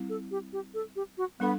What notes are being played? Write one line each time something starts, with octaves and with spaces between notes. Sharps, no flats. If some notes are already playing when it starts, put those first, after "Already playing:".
Already playing: G3 C4 E4
A4
G4
G4
A4
G4
F#4
G3 B3 D4 A4